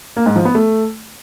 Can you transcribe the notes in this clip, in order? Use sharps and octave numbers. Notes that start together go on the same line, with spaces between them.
A#3
G#2
F3
B3
A3